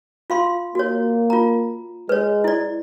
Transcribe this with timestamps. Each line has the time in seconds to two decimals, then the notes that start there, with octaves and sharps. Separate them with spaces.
0.30 F4 F5 C6
0.75 A#3 F#4 C#5
1.30 F4 A#5
2.09 G#3 B4 C#5
2.44 E4 D5